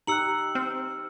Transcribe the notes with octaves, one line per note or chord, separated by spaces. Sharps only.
D#4 G4 A#5 E6 F#6 C#7 F#7
C4 F6